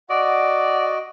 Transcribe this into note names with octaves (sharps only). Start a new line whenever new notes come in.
F#4 D5 D#5 F#5